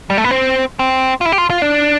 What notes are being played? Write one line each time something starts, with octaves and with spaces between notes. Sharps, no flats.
G3
A3
B3
C4
C4
F4
E4
G4
F4
F4
D4